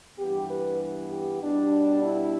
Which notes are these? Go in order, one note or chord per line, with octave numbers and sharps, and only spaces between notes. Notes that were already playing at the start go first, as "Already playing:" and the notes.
G2 E3 B3 G4
B4
G4
B2 G3 B3 D4
E4